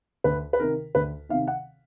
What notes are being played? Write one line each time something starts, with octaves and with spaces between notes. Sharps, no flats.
D2 B4
B4
C3 D#3 A#4
D2 B4
C3 D#3 F5
F#5